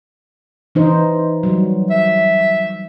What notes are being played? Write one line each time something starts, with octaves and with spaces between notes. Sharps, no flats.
E3 D#4 C5
F#3 G3
E5